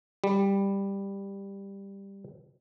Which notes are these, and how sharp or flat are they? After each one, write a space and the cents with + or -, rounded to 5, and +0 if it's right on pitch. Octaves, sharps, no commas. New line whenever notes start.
G3 +10